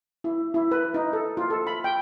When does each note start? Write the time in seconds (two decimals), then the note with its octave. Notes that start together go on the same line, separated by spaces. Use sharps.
0.24 E4
0.54 E4
0.71 B4
0.94 D#4
1.13 A4
1.37 F4
1.50 A4
1.67 B5
1.84 G5